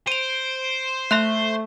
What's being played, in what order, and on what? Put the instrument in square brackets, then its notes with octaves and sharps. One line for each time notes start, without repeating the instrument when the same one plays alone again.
[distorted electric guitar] C5 [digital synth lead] D7 [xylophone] D#7 F7
[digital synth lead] A3 [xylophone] E5 C6 F#6